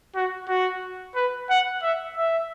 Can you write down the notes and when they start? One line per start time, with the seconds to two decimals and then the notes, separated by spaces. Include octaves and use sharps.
0.16 F#4
0.49 F#4
1.16 B4
1.50 F#5
1.83 E5
2.17 E5